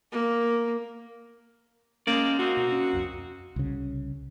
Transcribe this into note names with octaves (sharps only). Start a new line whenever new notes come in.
A#3
G#3 A#3 C#4 D5 G6
A#3 C4 D#4 F#4
B2
C#4
C2 F2
C2 C#3